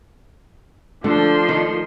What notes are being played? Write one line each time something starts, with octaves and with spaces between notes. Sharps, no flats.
D3 F3 A3 D4 C6
D#3